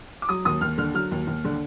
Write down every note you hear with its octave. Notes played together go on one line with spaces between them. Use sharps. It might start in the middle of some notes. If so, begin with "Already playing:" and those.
D6
F#3 D#6
D#2 D#6
D#2 F6
D3 F6
F#3 F6
D#2
D#2
D3